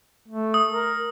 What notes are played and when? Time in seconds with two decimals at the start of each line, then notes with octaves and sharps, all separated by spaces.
0.28 A3
0.54 D#6
0.72 A#4